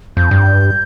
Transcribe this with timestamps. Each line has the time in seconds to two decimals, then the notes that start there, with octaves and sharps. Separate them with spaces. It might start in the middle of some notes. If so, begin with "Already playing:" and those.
0.17 F2 G6
0.31 G2